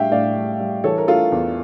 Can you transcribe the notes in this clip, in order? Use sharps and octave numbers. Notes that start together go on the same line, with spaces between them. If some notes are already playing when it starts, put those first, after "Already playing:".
Already playing: A2 G3 D4 E5 F5 G5
A2 D5 F5
G3
G3
E3 A4 C#5
A#4
A3 F4 A4
E2